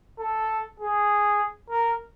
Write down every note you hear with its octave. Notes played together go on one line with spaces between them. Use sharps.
A4
G#4
A#4